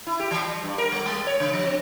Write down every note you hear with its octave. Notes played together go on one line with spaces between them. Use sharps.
E4
G4
E3
G3
G2
A#4
G3
G#3
C#5
C#3
F3
C4